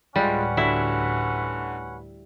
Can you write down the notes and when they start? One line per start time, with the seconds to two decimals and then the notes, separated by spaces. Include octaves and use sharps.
0.16 D2 A2 G3 G#3 C#4 F4 B4 F#5
0.57 D3 E4 F#4 B6